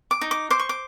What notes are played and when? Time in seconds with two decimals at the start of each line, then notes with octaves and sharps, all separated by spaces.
0.11 D6
0.21 D#4
0.31 D6
0.50 C5 D6
0.59 C#6
0.69 D6